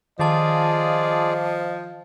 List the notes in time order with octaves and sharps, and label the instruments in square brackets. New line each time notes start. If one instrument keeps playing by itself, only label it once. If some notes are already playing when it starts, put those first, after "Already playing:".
[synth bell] D#3 A5 [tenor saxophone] F3 [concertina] F4 G#4 D5 [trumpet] D#5